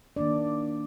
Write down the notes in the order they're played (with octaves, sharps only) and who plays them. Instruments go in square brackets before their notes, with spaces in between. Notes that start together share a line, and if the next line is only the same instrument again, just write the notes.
[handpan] D#3 A#3 D4 D5